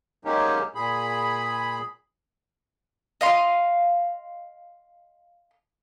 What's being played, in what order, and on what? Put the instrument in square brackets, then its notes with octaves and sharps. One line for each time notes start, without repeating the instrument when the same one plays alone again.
[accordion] F#3 G#3 A#3 C#4 D#4 G4
A#2 G#4 B5
[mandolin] D#5 F5 C6